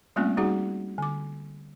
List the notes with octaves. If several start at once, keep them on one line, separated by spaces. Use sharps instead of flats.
G3 A3 A#3 C4 C#4 F4
G3 D#4 F#4 G#4 F#5
D3 D6